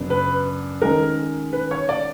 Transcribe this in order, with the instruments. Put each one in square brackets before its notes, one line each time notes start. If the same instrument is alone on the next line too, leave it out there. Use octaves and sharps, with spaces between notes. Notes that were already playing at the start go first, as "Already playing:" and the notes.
Already playing: [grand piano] F#2 C#3 B3 D4
B4
D#3 G#3 C#4 A#4
B4
C#5
D5